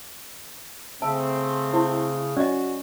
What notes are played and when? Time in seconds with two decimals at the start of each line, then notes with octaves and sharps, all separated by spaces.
1.02 C#3 A3 C4 E5 A5
1.73 E4 C5
2.37 C#4 F#4 D5 D#5